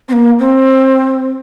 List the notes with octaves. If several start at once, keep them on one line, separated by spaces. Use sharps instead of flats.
C4
A#3
C4